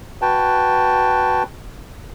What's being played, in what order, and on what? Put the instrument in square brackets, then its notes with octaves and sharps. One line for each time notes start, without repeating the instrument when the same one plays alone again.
[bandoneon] F#4 B4 G5 A5